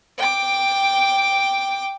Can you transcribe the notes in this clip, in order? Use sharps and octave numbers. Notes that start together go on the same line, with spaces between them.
G5 D6